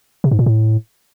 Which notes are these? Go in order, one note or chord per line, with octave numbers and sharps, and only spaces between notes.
C3
G#2
A#2
A2